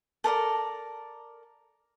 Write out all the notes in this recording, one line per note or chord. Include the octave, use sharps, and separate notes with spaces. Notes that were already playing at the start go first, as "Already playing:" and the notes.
A4 A#4 D5 A#5